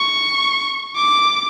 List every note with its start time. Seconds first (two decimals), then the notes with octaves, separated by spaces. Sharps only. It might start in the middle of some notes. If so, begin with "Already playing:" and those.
Already playing: C#6
0.96 D6